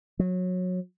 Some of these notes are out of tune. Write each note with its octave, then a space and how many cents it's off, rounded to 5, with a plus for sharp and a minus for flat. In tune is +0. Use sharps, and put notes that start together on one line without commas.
F#3 -20